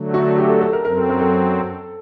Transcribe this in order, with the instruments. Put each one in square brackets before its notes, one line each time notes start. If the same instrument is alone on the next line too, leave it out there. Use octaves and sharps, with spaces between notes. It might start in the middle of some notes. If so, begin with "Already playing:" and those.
Already playing: [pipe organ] D3 F#3 A3
[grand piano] F#4
G4
A4
A4
A#4
[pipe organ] F#2 F#3 C4 [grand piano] A#4
[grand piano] A4
A#4
A4